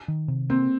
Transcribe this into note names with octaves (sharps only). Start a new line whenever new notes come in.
D#3
C3
A#3 C4